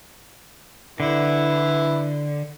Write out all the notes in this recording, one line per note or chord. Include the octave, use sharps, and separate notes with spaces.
D3 E4 B4